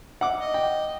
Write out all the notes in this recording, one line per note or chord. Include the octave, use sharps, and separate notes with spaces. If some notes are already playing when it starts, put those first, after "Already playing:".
F#5 D6
D#5
G5